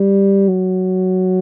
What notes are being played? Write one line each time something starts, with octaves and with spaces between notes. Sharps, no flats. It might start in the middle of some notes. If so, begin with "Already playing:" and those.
Already playing: G3
F#3